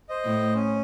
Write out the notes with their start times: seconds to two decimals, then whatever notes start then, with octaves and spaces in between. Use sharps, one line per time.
0.09 C5 D#5
0.25 A2
0.55 C#4